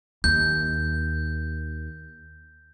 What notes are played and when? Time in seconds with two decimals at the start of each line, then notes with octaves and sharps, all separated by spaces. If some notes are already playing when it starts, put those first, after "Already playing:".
0.24 D#2 G6